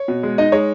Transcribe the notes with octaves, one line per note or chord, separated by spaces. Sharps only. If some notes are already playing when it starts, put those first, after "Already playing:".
Already playing: C#5
B2
G#3
D#4 D#5
G#3 C#5